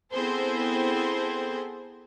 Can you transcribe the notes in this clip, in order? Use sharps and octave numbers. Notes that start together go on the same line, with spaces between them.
B3 C4 E4 G#4 A4 C5